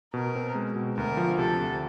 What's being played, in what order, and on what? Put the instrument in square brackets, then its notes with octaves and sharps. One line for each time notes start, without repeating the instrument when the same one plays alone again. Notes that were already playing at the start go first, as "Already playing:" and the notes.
[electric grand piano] B2 [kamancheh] A#4
[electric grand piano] C4
G#3
B2
[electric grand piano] D2 [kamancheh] A#4
[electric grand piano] F3
[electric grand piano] C3 [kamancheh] A4
[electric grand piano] D2